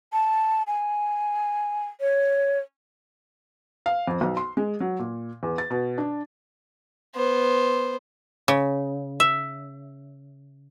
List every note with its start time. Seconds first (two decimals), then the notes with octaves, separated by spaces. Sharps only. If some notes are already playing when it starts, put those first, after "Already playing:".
0.13 A5
0.67 G#5
2.01 C#5
3.86 F5
4.07 F2
4.21 B1
4.37 C6
4.57 G#3
4.80 F#3
4.99 A#2
5.43 E2
5.58 A6
5.70 B2
5.98 D4
7.15 B3 C5
8.48 C#3
9.20 E5